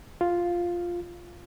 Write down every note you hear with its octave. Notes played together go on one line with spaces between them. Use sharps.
F4